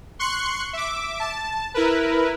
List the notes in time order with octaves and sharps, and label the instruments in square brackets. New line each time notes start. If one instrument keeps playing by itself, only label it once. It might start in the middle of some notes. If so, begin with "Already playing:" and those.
[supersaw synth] C6 C#6 F#6 C#7
E5 D6
A5
E4 A#4 B4